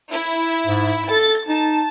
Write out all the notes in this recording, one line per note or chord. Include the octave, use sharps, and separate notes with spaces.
E4
G#2
A4 A6
D#4 A5